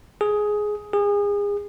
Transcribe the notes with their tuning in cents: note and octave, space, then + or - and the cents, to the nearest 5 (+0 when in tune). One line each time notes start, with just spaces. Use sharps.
G#4 +10
G#4 -30